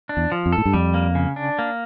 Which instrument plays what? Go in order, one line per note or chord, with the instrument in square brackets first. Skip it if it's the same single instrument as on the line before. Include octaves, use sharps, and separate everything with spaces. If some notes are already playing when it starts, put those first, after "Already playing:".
[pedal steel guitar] D4
[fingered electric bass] E2
[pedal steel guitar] F3
[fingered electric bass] F2
[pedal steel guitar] A4
[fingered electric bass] A2
G2
[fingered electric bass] F2 [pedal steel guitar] G3
[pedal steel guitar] A#3
C#3
D4
A#3